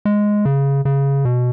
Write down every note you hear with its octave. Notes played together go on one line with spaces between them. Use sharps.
G#3
C#3
C#3
B2